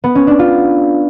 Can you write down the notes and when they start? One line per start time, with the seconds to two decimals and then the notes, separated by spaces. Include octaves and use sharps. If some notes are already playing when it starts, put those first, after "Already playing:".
0.04 B3
0.15 C#4
0.27 D4
0.39 F4